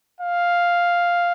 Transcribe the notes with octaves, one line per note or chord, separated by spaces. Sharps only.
F5